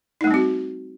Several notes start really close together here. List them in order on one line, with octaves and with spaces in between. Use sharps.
D#4 A3 G3 C4 F#4